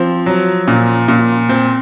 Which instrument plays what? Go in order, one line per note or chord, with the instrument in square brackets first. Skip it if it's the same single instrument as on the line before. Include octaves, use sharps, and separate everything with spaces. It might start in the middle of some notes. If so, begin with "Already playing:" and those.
Already playing: [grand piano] F3 [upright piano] C4
[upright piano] F#3
A#2
A#2
C4